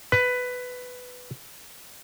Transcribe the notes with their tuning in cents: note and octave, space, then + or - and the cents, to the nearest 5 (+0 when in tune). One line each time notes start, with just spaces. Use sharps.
B4 +10